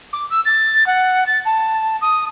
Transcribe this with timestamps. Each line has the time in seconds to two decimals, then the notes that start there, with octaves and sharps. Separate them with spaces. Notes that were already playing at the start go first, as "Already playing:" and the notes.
0.13 D6
0.30 E6
0.45 A6
0.86 F#5
1.26 A6
1.45 A5
2.01 D#6